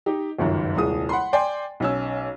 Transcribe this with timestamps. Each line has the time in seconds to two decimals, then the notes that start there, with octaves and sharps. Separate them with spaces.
0.06 D#4 G4
0.38 G1 C#2 F#2 D#3
0.77 D#1 C2 G#3 D#6
1.09 F#5 B5 C6
1.33 D5 G5 G#5 C6
1.80 B1 C#4 E6